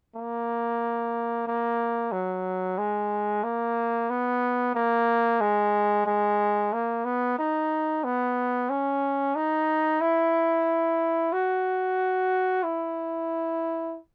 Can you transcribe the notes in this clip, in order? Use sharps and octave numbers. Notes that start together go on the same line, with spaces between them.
A#3
A#3
F#3
G#3
A#3
B3
A#3
G#3
G#3
A#3
B3
D#4
B3
C#4
D#4
E4
F#4
E4